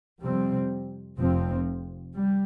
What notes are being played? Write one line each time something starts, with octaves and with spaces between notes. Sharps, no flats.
F2 C3 G3 C4
F1 F2 F3 C4
G3